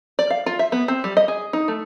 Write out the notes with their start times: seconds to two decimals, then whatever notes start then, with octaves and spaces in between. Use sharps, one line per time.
0.19 D5
0.30 F5
0.46 F4
0.59 E5
0.72 B3
0.88 C4
1.04 G3
1.17 D#5
1.28 G#4
1.53 D#4
1.68 A3